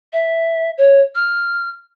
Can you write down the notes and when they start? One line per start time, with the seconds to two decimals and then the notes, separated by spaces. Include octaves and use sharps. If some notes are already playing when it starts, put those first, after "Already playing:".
0.13 E5
0.78 C#5
1.15 F6